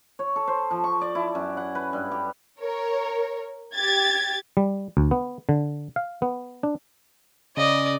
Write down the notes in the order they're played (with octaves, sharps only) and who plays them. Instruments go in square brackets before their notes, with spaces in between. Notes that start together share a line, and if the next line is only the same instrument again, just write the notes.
[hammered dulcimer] C#5
A4
C5
F3
C#6
D5
E4
F#2
F#5
B4
G2
G4
[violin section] A#4 C#5
G4 G#6 A6
[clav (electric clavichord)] G3
D2
B3
D3
F5
B3
D4
[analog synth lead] C#3 [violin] D5 [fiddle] D#5